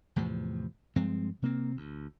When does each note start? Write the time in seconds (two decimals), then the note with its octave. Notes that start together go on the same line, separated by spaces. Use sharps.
0.16 E2 A2 C3 F3
0.96 G2 F3 G#3 C4
1.42 C3 A#3 C4
1.77 D2